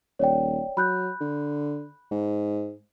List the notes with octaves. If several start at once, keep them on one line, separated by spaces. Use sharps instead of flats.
D#1 C#5 D5 G5
F#3 B5 F#6 G6
D3
G#2